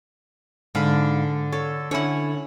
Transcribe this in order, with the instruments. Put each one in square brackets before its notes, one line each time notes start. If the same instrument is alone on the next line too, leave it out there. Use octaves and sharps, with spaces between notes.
[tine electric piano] G#2 F5 B5 [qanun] D3
[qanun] A4 [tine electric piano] C#5
[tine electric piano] D3 C#4 E4 [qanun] C#5 F#5